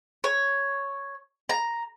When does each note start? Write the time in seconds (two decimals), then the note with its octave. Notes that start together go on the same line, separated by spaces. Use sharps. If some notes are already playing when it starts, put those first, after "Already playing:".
0.24 C#5
1.49 A#5